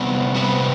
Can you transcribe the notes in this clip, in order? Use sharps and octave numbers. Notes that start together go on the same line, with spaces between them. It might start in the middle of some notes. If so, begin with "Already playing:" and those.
Already playing: C3 G3 B3
C3 G3 B3